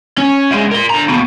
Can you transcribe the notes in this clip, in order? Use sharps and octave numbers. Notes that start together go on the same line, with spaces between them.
C#4
D2 G#3
A#4 C6
D3 A#5
D#2 B2